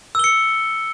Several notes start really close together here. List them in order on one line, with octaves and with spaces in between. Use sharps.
E6 G7 C#7